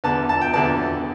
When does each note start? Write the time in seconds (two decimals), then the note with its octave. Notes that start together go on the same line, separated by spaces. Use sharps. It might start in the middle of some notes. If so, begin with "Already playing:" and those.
0.04 E2 D3 B3 A5
0.29 A5
0.41 G5
0.54 E2 D3 B3 A5